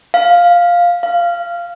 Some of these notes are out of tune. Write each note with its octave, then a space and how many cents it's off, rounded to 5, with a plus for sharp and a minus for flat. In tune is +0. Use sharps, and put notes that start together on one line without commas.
F5 +5
F5 -15